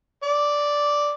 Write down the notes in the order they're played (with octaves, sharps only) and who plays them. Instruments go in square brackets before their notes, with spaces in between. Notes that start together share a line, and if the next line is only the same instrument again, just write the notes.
[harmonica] D5